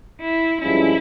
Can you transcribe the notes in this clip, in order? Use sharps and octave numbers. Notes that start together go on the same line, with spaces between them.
E4
G2 F3 G#3 C#4 E4 F4